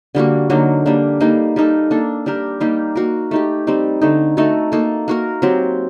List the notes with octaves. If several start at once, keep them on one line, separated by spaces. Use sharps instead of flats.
D3 G3 A#3 F#4
D3 F#3 A#3 D#4
G3 A#3 D4
G3 A#3 D#4
G3 A#3 D#4 A4
A#3 D4 A4
G3 D4 G4 A#4
G3 A#3 D#4 G4
A#3 F#4 A#4
A3 D#4 G4
G3 C4 D#4
D3 A3 D#4
A3 D#4 F#4 A4
A#3 D#4 A4
A#3 F#4 A#4
F#3 C4 G4